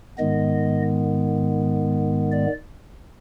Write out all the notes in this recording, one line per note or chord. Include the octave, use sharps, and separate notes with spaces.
G#2 D#3 G#3 B3 D#5
D5